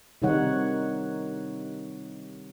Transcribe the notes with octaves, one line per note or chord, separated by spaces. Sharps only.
C3 D#3 G3 D#4 C#5 F#5